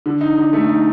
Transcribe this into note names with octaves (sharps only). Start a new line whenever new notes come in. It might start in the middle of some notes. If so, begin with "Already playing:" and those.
D3
D#4
D3
A3
D#4